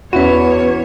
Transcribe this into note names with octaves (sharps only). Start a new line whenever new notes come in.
E2 B3 C#4 E4 F#4 B4 C#5